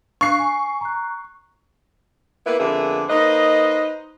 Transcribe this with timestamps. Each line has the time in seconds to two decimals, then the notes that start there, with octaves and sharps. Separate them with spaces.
0.21 D4 F5 C#6 F#6 C7
0.39 G#5
0.81 A#5 F#6
2.46 A#3 B3 E4 G4 B4
2.59 F2 D3 A#3 B3 G#4 E5
3.09 A#3 D#4 B4 C5 D#5